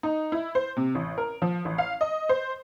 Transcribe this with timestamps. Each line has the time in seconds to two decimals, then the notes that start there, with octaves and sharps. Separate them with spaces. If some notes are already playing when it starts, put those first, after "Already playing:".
0.03 D#4
0.32 E4
0.55 C5
0.77 C3
0.95 A1
1.18 A#4
1.42 F3
1.65 A1
1.78 F5
2.01 D#5
2.29 C5